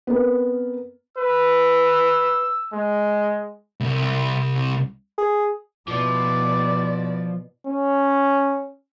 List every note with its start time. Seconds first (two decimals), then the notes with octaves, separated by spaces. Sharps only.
0.07 B3 C4 A#4
1.17 B4 E6
2.73 G#3
3.80 C2
5.18 G#4
5.88 B2 F3 E4 D5 D6
7.67 C#4